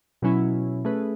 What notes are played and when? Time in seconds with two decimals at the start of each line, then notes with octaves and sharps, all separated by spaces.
0.22 B2 F#3 C#4 E4
0.85 A3 C#4 G#4 B4